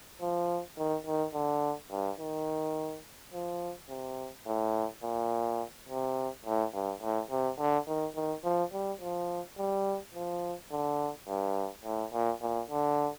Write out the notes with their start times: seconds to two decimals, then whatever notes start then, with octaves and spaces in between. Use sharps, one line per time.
0.21 F3
0.77 D#3
1.06 D#3
1.34 D3
1.91 G2
2.19 D#3
3.33 F3
3.90 C3
4.47 A2
5.03 A#2
5.89 C3
6.45 A2
6.74 G2
7.02 A2
7.31 C3
7.59 D3
7.87 D#3
8.15 D#3
8.44 F3
8.73 G3
9.01 F3
9.58 G3
10.14 F3
10.71 D3
11.28 G2
11.85 A2
12.13 A#2
12.42 A#2
12.70 D3